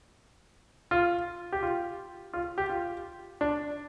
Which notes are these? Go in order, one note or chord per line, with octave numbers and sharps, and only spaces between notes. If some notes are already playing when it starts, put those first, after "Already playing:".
F4
G4
F4
F4
G4
F4
D4